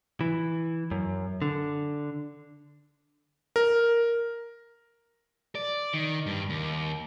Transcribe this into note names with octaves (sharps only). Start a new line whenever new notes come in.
E3
F#2
D3
A#4
D5
D#3
G2
D#2